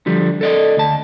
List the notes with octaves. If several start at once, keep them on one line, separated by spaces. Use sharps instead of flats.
D3 F3 G3
A4 D5 D#5
D2 A5